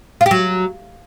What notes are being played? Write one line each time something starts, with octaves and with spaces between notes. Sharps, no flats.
F4
G4
F#3